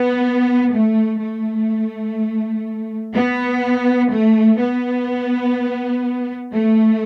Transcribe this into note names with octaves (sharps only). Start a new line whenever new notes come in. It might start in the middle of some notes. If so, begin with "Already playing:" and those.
Already playing: B3
A3
A3
B3
A3
B3
A3